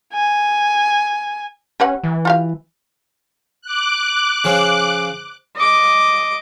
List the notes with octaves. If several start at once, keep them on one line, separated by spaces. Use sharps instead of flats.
G#5
C#4 G4 B4 F#5
E3
F4 G4 F5
D6 F#6
C#3 F3 C#4
D#5 D6